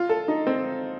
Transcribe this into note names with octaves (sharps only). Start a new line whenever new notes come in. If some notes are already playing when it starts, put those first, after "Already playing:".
Already playing: F4
A4
D#4
C4